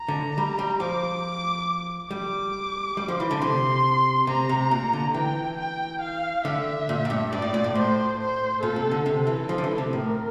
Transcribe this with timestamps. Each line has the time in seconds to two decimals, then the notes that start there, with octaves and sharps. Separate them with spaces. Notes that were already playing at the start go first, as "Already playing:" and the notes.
Already playing: A#5
0.08 D3
0.38 G3
0.59 G3
0.80 F3 D6
2.11 G3 D6
2.97 G3
3.08 F3
3.20 E3
3.31 D3
3.41 C3 C6
4.27 C3 A#5
4.49 C3
4.71 A#2
4.93 D3
5.14 E3 G5
5.58 G5
6.01 F5
6.45 D3 E5
6.89 A#2
7.05 A2
7.10 G2
7.31 G2 D5
7.42 A2
7.54 A#2
7.64 A2
7.75 A2 C5
8.19 C5
8.62 A#2 A4
8.76 C3
8.91 D3
9.06 C3 A4
9.27 E3
9.49 F3
9.58 D3
9.64 E3
9.78 C3
9.92 A2 A#4